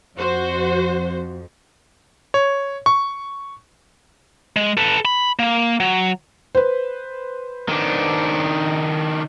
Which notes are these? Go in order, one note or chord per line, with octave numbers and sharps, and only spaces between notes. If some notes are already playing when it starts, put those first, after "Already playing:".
F2 F#4 C5
C#5
C#6
G#3
A4 B4
B5
A#3
F#3
B4 C5
D#3 D4